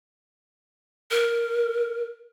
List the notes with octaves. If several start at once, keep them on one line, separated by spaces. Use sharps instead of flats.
A#4